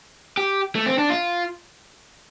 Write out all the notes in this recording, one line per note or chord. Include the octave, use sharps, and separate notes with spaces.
G4
A3
C4
D4
F4